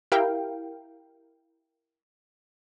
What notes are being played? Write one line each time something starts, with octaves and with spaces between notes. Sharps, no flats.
E4 G4 A#4 F5 G5